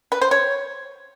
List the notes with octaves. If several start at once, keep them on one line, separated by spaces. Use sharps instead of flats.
B4
C5
C#5